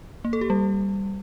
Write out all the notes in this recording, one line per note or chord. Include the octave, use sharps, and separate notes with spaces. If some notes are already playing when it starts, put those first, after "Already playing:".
A#3
A4
G4
G3